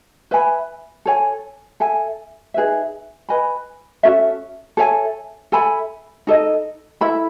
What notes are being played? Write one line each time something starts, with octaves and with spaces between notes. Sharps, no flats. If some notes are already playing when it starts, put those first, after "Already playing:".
B4 E5 G#5 B5
A4 C#5 G#5
A4 E5 G#5
D#4 G#4 B4 E5
B4 D#5 G#5 B5
C#4 F#4 A4 E5
A4 C#5 E5 G#5
A4 E5 G#5 B5
D#4 A4 D#5
E4 A4 E5 B5